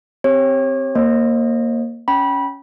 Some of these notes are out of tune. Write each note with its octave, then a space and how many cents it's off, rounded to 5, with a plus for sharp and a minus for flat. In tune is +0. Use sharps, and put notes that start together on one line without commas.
C4 +0 G4 +0 C#5 -30
A#3 +0 C5 +45 D#5 -15
C#4 +10 G5 -20 B5 -20